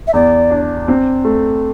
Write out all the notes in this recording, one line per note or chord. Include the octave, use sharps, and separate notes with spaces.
E5
E2 D5
D4
C4
A3